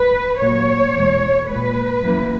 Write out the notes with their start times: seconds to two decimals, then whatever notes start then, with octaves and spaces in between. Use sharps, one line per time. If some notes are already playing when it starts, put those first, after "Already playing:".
Already playing: B4
0.41 A#2 F#3 A#3 C#5
0.95 E2 B2 G#3
1.50 A#2 G#3 B4
2.04 F#2 E3 A#3